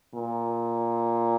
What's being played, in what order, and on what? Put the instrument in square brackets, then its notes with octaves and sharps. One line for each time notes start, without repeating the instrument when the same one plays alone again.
[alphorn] A#2